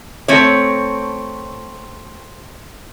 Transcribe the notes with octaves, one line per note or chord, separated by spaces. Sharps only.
A3 C4 C#5